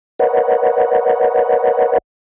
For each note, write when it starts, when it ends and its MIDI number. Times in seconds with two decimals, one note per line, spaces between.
0.19 1.98 70
0.19 1.98 71
0.19 1.98 73
0.19 1.98 75
0.19 1.98 78